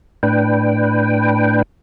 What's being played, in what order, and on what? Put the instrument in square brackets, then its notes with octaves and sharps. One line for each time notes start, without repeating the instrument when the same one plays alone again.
[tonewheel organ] A2 D4 B4 G5